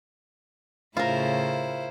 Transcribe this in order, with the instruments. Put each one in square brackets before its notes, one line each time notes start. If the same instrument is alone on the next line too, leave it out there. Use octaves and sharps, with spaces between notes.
[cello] A2 C#3 [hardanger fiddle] E4 C5 [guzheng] F4 A#4